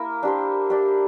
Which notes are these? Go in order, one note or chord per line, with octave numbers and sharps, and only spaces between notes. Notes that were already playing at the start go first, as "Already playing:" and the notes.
Already playing: A#3 E4 A#4
D4 G4 C5
D4 G4 D5